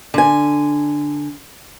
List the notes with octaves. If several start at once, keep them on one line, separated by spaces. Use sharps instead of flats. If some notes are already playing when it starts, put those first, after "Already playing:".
D3 G#5